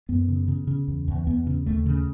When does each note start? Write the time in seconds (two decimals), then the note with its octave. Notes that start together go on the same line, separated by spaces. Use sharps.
0.09 F#2 B3
0.28 C#3
0.48 C#3
0.67 C#3
0.88 E2
1.08 E2
1.27 E2 B3
1.47 C#3
1.66 D#2 A3
1.86 C#3